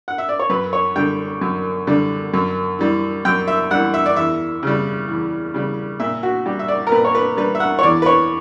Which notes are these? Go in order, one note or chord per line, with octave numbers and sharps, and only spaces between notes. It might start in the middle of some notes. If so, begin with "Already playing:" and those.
F#5
E5
D5
C#5
F#2 B4
C#5
D3 G3 G5
F#2
D3 G3
F#2
E3 G3
F#2 G5
E5
E3 G3 F#5
E5
D5
E2 E5
C#3 G3
E2
C#3 G3
A#2 E5
F#4
G3 G4
E5
D5
A#4
A#2 B4
C#5
B4
G3 B4
E5
F#5
C#5
E2 D5
B4
C#5